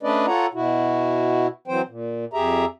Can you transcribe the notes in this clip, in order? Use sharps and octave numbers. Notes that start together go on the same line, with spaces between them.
A3 C#4 D4 B4 D5 D#5
F4 A4 C#5 F#5 A#5
B2 E4 F#4
E3 F#3 C4 C5 G5
A#2
F2 G4 G#4 E5 A#5